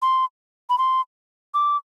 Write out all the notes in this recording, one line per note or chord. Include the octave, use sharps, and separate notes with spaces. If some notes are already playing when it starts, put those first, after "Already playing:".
C6
B5
C6
D6